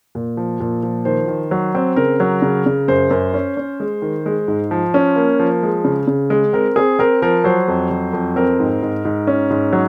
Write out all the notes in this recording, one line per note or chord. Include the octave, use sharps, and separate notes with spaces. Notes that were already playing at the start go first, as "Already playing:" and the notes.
A#2
F3
A#2
F3
D#3 C5
D#3
F#3
C4
C#3 A#4
F#3
C#3
C#3
F#2 C5
F#2
C#4
C#4
G#3
D#3
G#3
G#2
F3
C#4
A#3
F3
G#3
C#3
C#3
G#3
C4 A#4
C4 G#4
C4 A#4
F3 A#4
F#3 C5
F2
F#3
F2
C4 A#4
G#2
G#2
G#2
C#4
G#2
F#3